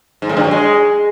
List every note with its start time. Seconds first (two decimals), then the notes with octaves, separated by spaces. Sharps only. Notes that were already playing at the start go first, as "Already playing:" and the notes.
0.22 G#2
0.29 A2
0.37 G2
0.44 F#3
0.51 G#3